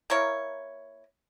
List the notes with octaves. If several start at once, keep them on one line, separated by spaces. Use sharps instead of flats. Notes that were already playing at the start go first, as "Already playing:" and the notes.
A#3 E4 A#4 C#5